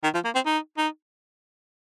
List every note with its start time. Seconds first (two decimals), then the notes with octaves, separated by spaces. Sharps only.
0.03 D#3
0.14 F3
0.25 A#3
0.35 C4
0.45 D#4
0.77 D#4